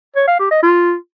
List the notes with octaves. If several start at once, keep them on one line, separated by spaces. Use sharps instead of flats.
C#5
F5
G4
D#5
F4